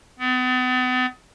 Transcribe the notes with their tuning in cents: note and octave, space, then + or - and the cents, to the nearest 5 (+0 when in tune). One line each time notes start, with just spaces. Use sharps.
B3 +40